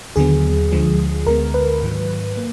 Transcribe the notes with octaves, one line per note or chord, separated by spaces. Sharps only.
D#2 D3 F#3 B3 G#4
D2 D3 F3 G#3
D2 D3 G#3 B3 A#4
B4
G#2 D#3 F#3
A#3